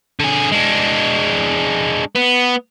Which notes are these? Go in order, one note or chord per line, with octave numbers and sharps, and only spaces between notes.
D3 G#4
G#3 D4
B3